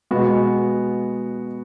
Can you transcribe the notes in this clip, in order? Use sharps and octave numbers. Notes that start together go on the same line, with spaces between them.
B2 G#3 B3 F#4